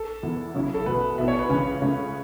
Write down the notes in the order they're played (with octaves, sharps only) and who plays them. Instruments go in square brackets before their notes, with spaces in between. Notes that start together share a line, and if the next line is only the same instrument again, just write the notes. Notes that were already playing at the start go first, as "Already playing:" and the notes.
Already playing: [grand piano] A4
[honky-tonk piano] E2 E3 B3 E4
C#3 F#3 C#4 E4
[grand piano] A4
[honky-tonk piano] E2 B2 A3 [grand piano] B4
[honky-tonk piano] B2 B3 E4 [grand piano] E5
[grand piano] C#5
B4
[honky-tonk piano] C#2 C#3 E3 [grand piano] C#4
[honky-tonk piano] C#2 C#3 A3 C#4